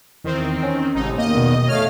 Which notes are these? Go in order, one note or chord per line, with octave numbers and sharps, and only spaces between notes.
E2 D#3 C4
C#4
G#1 A2 C3 D#4
E2 D#3 A#3 D#5
B2
A3 C#5 F5 F6